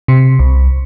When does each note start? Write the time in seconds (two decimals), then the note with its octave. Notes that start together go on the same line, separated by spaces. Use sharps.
0.08 C3
0.39 C2